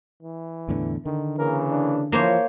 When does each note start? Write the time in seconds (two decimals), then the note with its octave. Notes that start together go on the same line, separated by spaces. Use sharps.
0.23 E3
0.69 E2 A2 D3
1.06 D3 D#3
1.38 C#3 E3 A#3 A#4
1.70 D4
2.12 E3 F3 A#3 C5 C#5